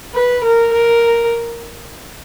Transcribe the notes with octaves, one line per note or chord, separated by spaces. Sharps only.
B4
A#4
A#4